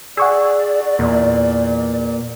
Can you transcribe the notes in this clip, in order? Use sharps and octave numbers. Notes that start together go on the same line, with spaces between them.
G#4 D5 F#5 C#6 E6
E2 A#2